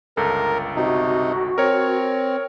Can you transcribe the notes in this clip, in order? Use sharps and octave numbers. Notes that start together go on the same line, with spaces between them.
G1 C#2 A4 A#4
C3 D#4 F#4
C4 A#4 C#5